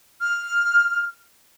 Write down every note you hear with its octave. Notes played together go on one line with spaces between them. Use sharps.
F6